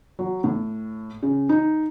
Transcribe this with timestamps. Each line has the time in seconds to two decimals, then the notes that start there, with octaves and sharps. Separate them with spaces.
0.19 F#3
0.44 A2
1.23 C#3
1.49 D#4